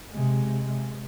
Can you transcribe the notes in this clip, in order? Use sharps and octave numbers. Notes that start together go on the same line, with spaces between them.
C3 G#3